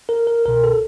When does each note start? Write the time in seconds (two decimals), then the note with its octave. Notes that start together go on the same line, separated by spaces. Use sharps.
0.09 A#4
0.27 A#4
0.46 C2 B2 A#4
0.64 A4